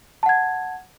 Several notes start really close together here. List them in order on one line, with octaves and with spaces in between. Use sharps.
A5 F#5 G#6